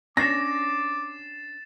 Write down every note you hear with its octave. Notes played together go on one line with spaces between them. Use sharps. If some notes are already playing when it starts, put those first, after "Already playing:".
C#4 D4 C#5 D6 A6 A#6 C7 E7